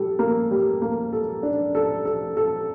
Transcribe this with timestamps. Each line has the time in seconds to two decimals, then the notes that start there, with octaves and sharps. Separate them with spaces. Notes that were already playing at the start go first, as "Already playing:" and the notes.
Already playing: G3 A4
0.19 A#3
0.51 G3
0.82 A#3
1.13 A4
1.43 D4
1.75 A4
2.05 A4
2.37 A4